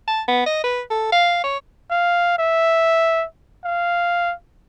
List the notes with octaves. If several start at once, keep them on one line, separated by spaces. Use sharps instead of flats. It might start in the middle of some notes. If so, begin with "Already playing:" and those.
A5
B3
D#5
B4
A4
F5
C#5
F5
E5
F5